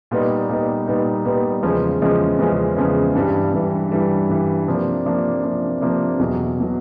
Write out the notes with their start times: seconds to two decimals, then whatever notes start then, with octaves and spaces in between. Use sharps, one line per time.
0.11 A#2 G3 B3 D#4
0.49 A#2 G3 B3 D#4
0.87 A#2 G3 B3 D#4
1.25 A#2 G3 B3 D#4
1.63 E2 C#3 F3 G#3 C#4
2.02 E2 C#3 F3 G#3 C#4
2.39 E2 C#3 F3 G#3 C#4
2.77 E2 C#3 F3 G#3 C#4
3.15 G2 E3 G3
3.54 G2 E3 G3
3.91 G2 E3 G3
4.29 G2 E3 G3
4.67 C3 F3 A#3 D4
5.05 C3 F3 A#3 D4
5.43 C3 F3 A#3 D4
5.81 C3 F3 A#3 D4
6.19 E2 B2 F#3
6.60 B2 F#3